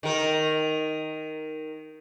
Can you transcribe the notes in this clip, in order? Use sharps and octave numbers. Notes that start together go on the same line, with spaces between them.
D#3 A#4